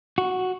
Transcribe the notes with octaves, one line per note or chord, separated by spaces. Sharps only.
F#4